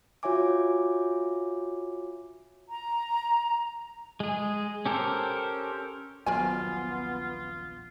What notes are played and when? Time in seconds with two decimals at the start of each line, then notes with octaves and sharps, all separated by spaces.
0.23 F4 F#4 C#5 E5 G#5 D6
2.69 A#5
4.20 G#3 G#4
4.86 C#4 G4 A4 A#4 C5
6.26 D#1 A#1 F#3 B3 F4 A#4 C5 G#5